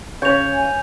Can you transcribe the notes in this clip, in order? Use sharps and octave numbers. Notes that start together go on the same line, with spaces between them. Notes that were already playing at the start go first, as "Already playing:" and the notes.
C#3 C#5 G6 F7
G#5